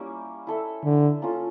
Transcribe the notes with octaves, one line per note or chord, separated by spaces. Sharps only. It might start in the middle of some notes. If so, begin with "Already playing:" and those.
Already playing: G3 A#3 C#4 E4
E4 A4 E5
D3
A#3 C#4 F4 A4